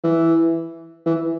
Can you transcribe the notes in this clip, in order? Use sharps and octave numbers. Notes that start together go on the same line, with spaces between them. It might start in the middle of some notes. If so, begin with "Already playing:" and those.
E3
E3